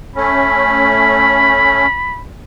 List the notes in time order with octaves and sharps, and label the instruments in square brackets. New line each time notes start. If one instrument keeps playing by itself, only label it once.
[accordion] A3 C#4 [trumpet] B5